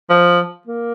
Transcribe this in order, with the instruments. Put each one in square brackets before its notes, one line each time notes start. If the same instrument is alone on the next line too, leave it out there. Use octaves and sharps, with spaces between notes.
[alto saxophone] F3
A#3